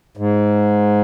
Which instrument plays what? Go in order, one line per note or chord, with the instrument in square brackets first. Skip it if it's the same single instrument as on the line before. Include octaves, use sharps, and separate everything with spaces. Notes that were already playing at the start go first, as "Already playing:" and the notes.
[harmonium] G#2